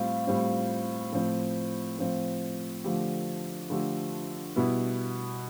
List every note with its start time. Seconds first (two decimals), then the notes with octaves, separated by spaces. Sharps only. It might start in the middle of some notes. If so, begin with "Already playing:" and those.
Already playing: A2 G3 C4 F4
0.27 A2 G3 C4 F4
1.12 A2 F3 C4
1.99 A2 F3 C4
2.84 D3 F3 A3 D4 G4
3.70 D3 F3 A3 D4 G4
4.56 B2 G3 B3 E4